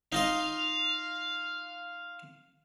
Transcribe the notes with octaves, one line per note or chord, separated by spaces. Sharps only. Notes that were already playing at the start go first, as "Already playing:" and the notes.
D#4 F4 D#5 F5